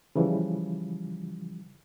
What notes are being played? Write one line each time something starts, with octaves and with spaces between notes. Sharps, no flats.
C#3 E3 F3 G3